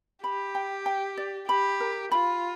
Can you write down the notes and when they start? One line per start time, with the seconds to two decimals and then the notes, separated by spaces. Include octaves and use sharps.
0.24 G4 B5
0.55 G5
0.86 G5
1.17 D5
1.49 G4 B5
1.80 A#4
2.12 F4 B5